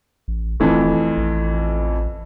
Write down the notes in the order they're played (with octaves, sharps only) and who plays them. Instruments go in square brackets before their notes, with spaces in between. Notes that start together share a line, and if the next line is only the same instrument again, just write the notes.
[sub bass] A1
[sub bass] D#1 [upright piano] F2 E3 A3
[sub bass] A1